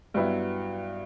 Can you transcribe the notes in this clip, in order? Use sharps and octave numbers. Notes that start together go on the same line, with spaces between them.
G2 F#3 B3 E4